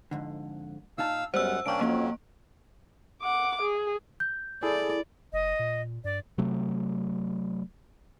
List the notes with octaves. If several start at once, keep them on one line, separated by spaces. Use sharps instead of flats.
F2 G#2 D3
A#2 D#4 F5 A5 E6
F#2 G3 G#3 B3 C5 F#5 E6
C2 A#3 C#4 D4 G5 C#6 D7
F2 F3 F#3 A#3 C#4 F4
F#5 D6
G#4
G6
E4 G#4 A4 D5
F#1 D#5
A#2
G2 D5
C3 F#3 A3